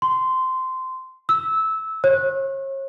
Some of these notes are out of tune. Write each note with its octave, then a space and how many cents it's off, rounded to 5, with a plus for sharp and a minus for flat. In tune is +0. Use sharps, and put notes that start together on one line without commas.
C6 -15
E6 -15
C#5 -40